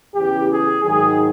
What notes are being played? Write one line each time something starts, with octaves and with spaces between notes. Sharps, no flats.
E2 C#3 E3 G4
G#4
G#2 D#3 F#3 G#4